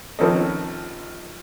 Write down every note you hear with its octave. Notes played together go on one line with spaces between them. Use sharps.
A#1 D#3 C4 C#4 A4 D#5